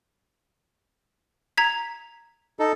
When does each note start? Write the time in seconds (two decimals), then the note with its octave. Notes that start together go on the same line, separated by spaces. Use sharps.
1.57 A#5 G#6 B6
2.59 D#4 A4